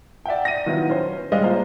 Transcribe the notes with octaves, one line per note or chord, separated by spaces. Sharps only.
D5 E5 F#5 G5
A#6 D#7
D#3 F#3 B3 E4 F4
C#4 C5
G3 G#3 C#4 D5 D#5 F5
A#3 F4 C5